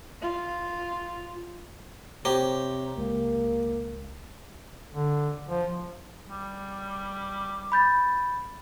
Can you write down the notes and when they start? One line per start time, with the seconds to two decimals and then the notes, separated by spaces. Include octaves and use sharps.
0.22 F4
2.25 C3 G4 C5 C#5 A#5
2.98 C#2 A#3
4.93 D3
5.49 F3
6.29 G3
7.72 B5 G6 A6